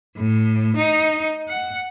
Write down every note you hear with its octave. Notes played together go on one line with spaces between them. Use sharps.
A2
D#4
F#5